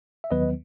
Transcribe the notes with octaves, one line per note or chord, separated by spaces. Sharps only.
E5
D#2 D#3 F#3 B3 B4 D#5